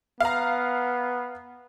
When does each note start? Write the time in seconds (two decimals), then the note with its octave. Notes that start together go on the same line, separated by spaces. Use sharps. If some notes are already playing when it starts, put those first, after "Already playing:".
0.20 B3 F5 A#5